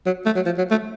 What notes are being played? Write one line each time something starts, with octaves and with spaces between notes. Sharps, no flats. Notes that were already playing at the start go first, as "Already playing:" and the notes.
F#3
A3
F#3
F3
F#3
A3